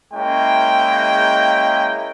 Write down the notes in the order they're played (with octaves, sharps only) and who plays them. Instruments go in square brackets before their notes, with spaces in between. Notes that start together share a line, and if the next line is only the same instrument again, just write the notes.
[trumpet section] G#3 A#3 C#4 E4 G5